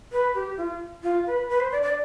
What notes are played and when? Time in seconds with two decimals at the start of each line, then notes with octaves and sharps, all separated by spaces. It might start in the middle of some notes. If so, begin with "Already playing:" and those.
0.12 B4
0.35 G4
0.57 F4
1.03 F4
1.27 B4
1.49 B4
1.60 C5
1.72 D5
1.83 D5